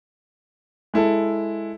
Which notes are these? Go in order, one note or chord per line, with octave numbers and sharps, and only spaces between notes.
G#3 E4 A4